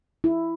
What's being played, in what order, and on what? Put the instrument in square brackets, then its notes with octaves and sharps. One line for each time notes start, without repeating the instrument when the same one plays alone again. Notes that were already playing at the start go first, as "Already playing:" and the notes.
[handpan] E4